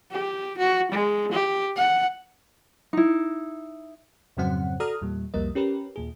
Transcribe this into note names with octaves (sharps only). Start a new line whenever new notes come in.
G4
F#4
G#3
G4
F#5
D#4 E4
F2 G#2 C#3 F#3 C4 F#5
F#4 A4 D5 A#5 D#6 F6
E2 A#2 G3
C2 F2 G3 A#3 A#4 D#5
C#4 G4 A#4 B4
D#2 A#2 G#4